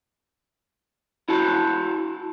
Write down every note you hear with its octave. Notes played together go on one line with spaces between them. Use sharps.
E4 F#4 A5